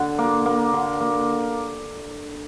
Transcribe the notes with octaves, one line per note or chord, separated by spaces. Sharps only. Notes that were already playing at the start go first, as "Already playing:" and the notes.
Already playing: D3
A#3
A#3
D3
A#3